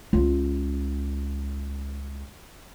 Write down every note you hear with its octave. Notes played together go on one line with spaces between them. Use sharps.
C#2 F4